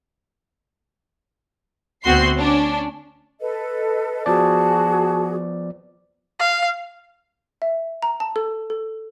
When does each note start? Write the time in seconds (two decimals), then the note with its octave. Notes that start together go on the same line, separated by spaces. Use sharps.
2.03 D2 B3 C4 F#4 C6 C7
2.35 C#4 D4
3.40 A4 B4 D#5
4.26 F3 B3 F#4 G#4 D5 A5
6.40 F5
7.62 E5
8.03 A#5
8.20 A5
8.36 A4
8.70 A4